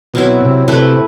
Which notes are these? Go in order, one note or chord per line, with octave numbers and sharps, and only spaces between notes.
B2 F#3 C4 E4
C3
C3 A3 E4 B4